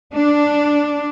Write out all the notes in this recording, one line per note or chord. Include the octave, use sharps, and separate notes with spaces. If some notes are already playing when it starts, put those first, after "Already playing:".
D4